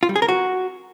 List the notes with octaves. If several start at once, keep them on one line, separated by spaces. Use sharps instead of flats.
F4
G3
G#4
A#4
F#4